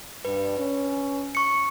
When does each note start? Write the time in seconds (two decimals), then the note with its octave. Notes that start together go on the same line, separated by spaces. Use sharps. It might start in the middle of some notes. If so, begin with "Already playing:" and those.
0.25 G2 B4
0.58 C#4
1.35 C#6 C#7